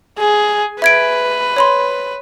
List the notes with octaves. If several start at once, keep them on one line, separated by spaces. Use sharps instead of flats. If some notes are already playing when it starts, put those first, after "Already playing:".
G#4
B4 E5 G#6 D7
C#5 B5 C6